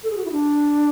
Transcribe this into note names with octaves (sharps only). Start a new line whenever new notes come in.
A4
G#4
F#4
E4
D4